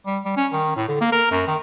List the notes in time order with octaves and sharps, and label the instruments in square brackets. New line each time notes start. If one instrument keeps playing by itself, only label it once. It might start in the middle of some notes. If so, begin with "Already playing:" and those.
[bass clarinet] G3
G3
C#4
D#3
A2
D3
A#3
A#4
F#2
D#3